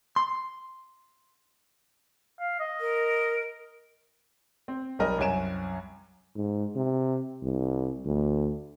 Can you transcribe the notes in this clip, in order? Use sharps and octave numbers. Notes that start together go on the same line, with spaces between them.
C6
F5
D#5
A#4
C4
B1 G3 A#4 D#5
C2 F#2 C#5 G#5 D7 E7
G#2
C3
C2
D2